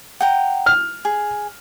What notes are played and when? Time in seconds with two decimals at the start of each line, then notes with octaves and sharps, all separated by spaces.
0.21 F#5 G5 A#5
0.66 F6
1.05 G#4